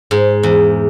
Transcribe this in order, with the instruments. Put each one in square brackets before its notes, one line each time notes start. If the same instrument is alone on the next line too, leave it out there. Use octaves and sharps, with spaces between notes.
[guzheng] G#2
E2